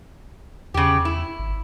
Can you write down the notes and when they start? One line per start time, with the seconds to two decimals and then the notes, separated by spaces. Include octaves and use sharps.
0.74 E2 C#3 G4
1.05 E4
1.39 G#1